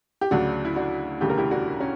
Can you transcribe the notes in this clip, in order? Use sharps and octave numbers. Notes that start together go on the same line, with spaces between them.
G4
D2 C#3 F#3 D4 F#4
E4
D4 F#4
E1 D2 C#3 G3 G4
A#4
E4 G4
D4 F#4
C#4